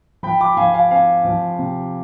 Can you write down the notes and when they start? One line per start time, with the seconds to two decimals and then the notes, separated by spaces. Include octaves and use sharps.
0.23 F3 G5 B5
0.41 B5 D6
0.57 F3 F5 G#5
0.74 F5 G#5
0.91 C4 F5 G#5
1.25 F3
1.59 C3